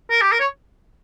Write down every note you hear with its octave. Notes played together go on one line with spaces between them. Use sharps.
A#4
G4
A#4
C#5